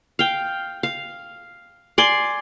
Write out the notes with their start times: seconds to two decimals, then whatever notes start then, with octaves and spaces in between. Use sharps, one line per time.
0.19 F5 G5
0.83 F5
1.98 D5 G#5 C6